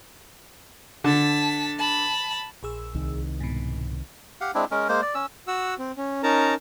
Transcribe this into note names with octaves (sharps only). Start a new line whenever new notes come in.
D3 A5 B6
A5 B5
A#1 G#4 E6
C2 D#3
G#2 B2
G4 F5 F#5
G#3 C4 D4 E4
G#3 C#4 A#4
G#3 A#3 C5
D5
C#4 E6
F#4 F#5 E6
C4
C#4
C#4 D#4 A#4 A5 A#5